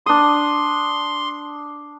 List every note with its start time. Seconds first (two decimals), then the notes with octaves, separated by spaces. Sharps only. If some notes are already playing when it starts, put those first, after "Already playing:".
0.06 D4 C6 D#6